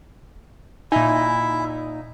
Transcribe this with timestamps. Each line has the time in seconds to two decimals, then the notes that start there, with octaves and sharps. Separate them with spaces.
0.92 A#2 D#4 E4 E5 G#5